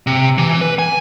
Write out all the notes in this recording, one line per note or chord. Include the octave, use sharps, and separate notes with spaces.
C3
E3
B4
G#5